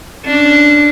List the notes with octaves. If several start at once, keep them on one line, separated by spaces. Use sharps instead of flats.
C#4 D4